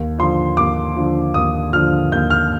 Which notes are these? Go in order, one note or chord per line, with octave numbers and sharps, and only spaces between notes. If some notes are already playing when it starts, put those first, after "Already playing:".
Already playing: D#2
D3 F3 C6
D#2 D6
D3 F3
D#2 D#6
D3 F3 F6
D#2 G6
F6